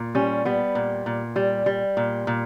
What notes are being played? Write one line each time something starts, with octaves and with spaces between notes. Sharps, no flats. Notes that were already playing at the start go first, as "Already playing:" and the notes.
Already playing: A#2
G3 C#4
G3 B3
A#2
A#2
G3
G3
A#2
A#2